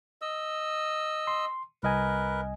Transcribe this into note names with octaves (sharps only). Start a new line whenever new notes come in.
D#5 E6
C6
C2 A#4 B4 D#5 G#5